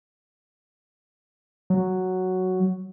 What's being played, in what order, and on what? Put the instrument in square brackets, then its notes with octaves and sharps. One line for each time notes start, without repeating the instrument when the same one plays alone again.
[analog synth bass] F#3